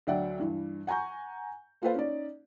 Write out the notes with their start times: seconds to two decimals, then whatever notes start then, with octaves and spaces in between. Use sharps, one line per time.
0.07 D2 F#3 D5 E5 F#5 G5
0.39 G2 E3
0.87 F#5 G#5 A#5 C#6 G6
1.82 A#3 F4 A4 B4 C5 F5
1.94 C#4 D#4 D5